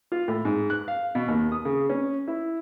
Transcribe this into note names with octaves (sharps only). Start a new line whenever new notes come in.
F4
A2
G#2
F#6
F5
B2
D#2
D#6
C#3
C#4
E4